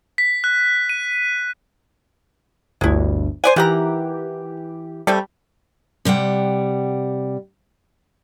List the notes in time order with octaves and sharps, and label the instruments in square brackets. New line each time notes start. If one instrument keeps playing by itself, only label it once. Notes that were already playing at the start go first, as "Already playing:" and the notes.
[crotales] B6
F#6
D#7
[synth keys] G1 D2 [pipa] G#3 E4
[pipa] C5 D5 F#5 [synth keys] G#5
[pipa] D#3 F#5 A#5 [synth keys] E3 G4
[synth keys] G3 [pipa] A3 C4 A4
[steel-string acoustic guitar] C3 G3 F#5 G5